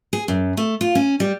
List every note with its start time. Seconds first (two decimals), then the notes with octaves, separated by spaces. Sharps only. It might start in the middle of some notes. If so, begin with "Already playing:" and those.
0.13 G#4
0.28 F#2
0.57 A3
0.81 F4
0.95 C#4
1.20 G3